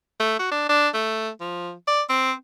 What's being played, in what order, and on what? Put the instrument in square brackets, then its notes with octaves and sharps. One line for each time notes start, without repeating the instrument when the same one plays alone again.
[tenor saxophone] A3
F#4
D4
D4
A3
F3
D5
C4